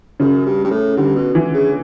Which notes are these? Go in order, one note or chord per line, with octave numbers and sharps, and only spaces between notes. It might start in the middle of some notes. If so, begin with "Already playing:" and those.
F#2 C#3
G2
G2
A2
G2 D3
B2
E3
C#3